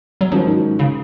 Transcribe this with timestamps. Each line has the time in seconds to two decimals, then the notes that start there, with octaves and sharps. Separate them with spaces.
0.21 F#3
0.32 G#2 D#3 F3 G#3 C#4 F#4
0.79 C#3